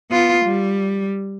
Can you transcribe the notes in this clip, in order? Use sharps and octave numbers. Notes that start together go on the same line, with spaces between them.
B3 F4
G3